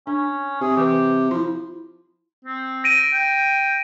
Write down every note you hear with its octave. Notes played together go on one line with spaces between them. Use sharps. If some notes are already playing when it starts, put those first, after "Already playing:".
C#4 D4
C3 G#4
E3 G4 B4
F3 E4 C6
C4
A#6 D7 D#7
G5